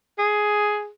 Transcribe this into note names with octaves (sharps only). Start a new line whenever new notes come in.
G#4